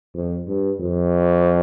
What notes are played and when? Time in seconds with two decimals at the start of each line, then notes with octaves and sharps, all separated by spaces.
0.15 F2
0.48 G2
0.80 F2